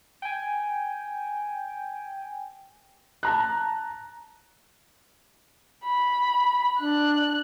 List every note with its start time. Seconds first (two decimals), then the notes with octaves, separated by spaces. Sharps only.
0.22 G5 G#5
3.23 A5 A#5 F#6
5.85 B5
6.80 D4 F#6